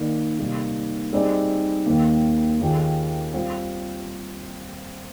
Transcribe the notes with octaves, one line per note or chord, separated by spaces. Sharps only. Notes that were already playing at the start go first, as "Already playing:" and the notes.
Already playing: D#3 A#3 D#4 A#4 D5
C3 G3 A#3 D#4
G3 C4 D#4 G#4 D5
D#2 D#3 A#3
D#2 D#3 A#3 F4 G#4
G3 C4 F4 C5 F5